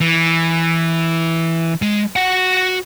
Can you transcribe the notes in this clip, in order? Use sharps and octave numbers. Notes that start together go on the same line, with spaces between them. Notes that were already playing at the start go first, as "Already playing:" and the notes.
E3
G#3
F#4 F#5